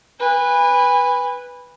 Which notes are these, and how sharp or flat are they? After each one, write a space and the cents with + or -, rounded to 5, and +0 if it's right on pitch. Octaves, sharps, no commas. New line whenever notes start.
B4 -5 G#5 -35